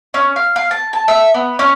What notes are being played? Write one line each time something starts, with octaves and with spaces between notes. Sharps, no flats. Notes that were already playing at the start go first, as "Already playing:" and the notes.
C#4
F5
F5
A5
A5
E5
B3
C#4